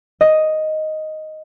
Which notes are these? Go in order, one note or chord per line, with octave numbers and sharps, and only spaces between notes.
D#5